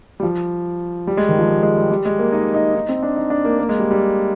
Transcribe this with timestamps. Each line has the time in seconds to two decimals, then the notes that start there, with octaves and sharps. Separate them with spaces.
0.20 G3
0.23 F3
1.07 G3
1.17 G#3
1.29 D#3
1.39 F3
1.49 G3
1.63 G#3
1.77 G3
1.91 G3
2.05 G#3
2.19 A#3
2.32 D#4
2.54 D#4
2.75 D#4
2.89 C4
3.03 D4
3.16 D#4
3.30 D4
3.45 A#3
3.59 A#3
3.69 G#3
3.79 G3
3.91 G3